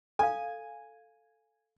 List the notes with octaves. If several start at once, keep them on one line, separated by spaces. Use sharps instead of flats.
A4 F5 G#5